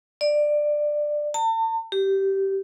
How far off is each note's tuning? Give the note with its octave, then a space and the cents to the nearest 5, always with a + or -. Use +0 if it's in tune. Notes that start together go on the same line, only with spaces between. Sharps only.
D5 +15
A5 +40
G4 -15